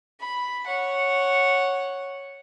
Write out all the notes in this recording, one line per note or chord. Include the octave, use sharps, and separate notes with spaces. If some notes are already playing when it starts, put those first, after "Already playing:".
B5
C#5 F#5